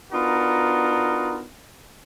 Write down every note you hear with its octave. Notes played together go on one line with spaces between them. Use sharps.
B3 D4 D#4 F4 F#4 A#4